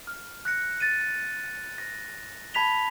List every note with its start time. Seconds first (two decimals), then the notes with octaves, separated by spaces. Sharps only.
0.07 F6
0.45 F#6 A#6 C#7
0.80 A6 D#7
1.78 A#6
2.54 A5 B5 G#6 B6 F7 G7